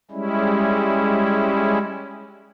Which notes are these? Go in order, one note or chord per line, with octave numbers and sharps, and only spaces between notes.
G3 G#3 C#4 E4